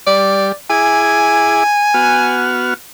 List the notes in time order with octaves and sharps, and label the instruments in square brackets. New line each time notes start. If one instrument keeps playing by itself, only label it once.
[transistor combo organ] G3 [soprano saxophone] D5
[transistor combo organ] E4 G#4 D6 [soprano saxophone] G#5
[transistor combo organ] B3 F#4 F6